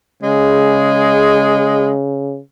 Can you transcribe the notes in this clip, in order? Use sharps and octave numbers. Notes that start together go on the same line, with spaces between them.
C#3 G#3